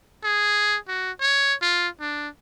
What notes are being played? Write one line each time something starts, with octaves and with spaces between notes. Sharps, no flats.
G#4
F#4
C#5
F4
D4